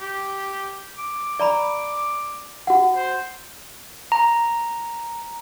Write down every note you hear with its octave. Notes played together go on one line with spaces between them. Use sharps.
G4
D6
D5 A#5 B5
F#4 F#5
C5
A#5